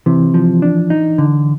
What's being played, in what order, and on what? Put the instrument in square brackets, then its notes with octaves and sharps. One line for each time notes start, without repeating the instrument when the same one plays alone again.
[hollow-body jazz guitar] C3 [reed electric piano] E3
[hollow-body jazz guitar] F3
D4
D#4
D3